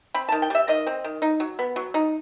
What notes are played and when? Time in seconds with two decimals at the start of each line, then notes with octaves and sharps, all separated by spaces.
0.14 C4 B5
0.29 A5
0.32 D#3
0.42 G5
0.50 G3 E5
0.68 D#3 D#5
0.87 C4
1.04 D#3
1.22 D#4
1.40 F#3
1.59 B3
1.76 F#3
1.94 D#4